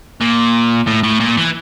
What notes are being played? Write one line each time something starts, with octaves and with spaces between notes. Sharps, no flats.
A#2
A2
A2
A#2
E3